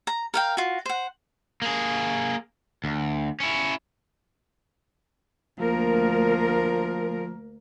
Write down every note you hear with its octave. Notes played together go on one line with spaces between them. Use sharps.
A#5
A#4 F5 G5
F4 F#4
C5 F#5
A#3 G#4
D2
C#4 E4
D2 F3 A#3 A#4